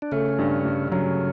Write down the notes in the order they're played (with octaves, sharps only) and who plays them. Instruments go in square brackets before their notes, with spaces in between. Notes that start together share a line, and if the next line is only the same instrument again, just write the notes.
[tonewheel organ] D4
[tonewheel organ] C#3 C#4 [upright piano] A3
[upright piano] G2
G2
[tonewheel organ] C#3 C#4 [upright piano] F#3